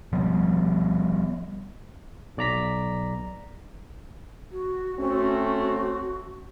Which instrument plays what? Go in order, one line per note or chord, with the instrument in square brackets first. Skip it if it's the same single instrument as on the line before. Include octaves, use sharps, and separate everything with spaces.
[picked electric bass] F3 G3 B3
[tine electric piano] B1 D5 A#5 B6
[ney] F#4
[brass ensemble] A3 C4 C#4 [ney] F#4